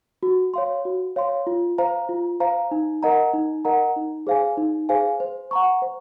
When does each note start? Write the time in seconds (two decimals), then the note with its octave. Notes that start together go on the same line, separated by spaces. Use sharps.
0.23 F#4
0.54 C#5 F5 C6
0.85 F#4
1.16 C#5 F5 C6
1.47 F4
1.78 C5 F5 A#5
2.09 F4
2.40 C5 F5 A#5
2.71 D#4
3.03 A#4 D#5 F#5 A#5
3.34 D#4
3.65 A#4 D#5 F#5 A#5
3.96 D#4
4.27 G#4 C5 F5 G#5
4.58 D#4
4.89 G#4 C5 F5 G#5
5.20 C5
5.51 F#5 A#5 C#6
5.82 C5